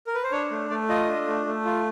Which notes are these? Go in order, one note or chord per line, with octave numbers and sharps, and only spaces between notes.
A#4
B4
C5
D4 C#5
A3
A3 D5
F4 D#5
D4
A3
A3
F4